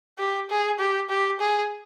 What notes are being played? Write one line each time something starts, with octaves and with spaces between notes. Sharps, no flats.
G4
G#4
G4
G4
G#4